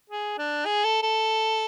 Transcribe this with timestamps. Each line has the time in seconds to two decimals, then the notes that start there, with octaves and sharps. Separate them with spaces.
0.10 G#4
0.38 D4
0.66 G#4
0.84 A4
1.03 A4